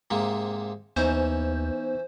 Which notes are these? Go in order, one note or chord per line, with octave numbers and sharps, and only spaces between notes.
G#2 C3 A#3
D#2 E3 B3 C#4 D#4 C5